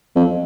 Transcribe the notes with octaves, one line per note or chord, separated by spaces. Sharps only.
F2